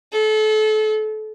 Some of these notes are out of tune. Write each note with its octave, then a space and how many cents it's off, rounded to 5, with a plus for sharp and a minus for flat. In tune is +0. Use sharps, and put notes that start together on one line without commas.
A4 -30